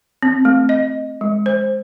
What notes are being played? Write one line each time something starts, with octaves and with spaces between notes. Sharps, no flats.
C4
A3
D#5
G#3
C5